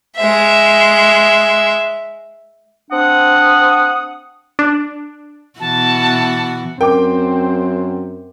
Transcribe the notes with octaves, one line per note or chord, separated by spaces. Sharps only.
G#3 E5
C4 D4 F#5 D#6
D4
B2 E3 F#4 A5
F#2 C4 A#4 G5 D6